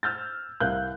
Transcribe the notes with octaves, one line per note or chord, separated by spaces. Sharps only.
E6 F6 G6 A6
C2 A#4 F5 F#6 G6